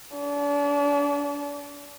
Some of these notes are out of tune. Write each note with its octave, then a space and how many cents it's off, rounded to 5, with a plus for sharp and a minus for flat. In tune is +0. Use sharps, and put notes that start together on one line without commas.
D4 -35